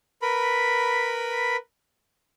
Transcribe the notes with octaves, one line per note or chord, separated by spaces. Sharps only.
A#4 B4 B5